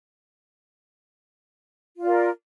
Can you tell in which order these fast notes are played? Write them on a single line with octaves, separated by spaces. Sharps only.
F4 D5 A#4